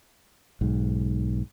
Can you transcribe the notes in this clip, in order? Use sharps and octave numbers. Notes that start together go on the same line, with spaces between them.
B1 G#2